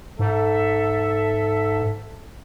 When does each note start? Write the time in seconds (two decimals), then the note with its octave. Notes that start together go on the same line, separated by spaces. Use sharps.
0.19 G#2 A4 E5